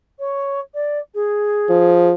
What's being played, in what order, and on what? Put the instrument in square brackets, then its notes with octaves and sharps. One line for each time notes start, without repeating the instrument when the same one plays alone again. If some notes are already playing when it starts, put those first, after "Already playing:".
[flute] C#5
D5
G#4
[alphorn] F3